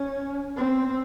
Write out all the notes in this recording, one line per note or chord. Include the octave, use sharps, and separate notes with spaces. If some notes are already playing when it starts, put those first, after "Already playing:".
Already playing: C#4
C4